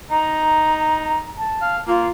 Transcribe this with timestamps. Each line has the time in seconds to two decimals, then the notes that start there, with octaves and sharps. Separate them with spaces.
0.11 D#4 A#5
1.38 A5
1.62 F5
1.87 A#3 F4